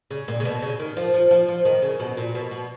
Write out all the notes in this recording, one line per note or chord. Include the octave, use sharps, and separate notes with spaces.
C#3
A#2
C#3
B2
C#3
D#3
F3
F3
F3
F3
D#3
C#3
B2
A#2
B2
B2